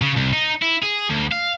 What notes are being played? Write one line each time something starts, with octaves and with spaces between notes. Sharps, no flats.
C#3
C2
D#4
E4
G#4
D2
F5